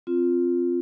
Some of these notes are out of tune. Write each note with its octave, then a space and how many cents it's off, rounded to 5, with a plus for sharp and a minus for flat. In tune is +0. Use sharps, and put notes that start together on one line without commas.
C4 +0 F4 +0